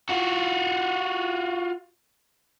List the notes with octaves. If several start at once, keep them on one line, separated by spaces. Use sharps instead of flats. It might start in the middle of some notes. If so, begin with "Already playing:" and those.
F4 F#4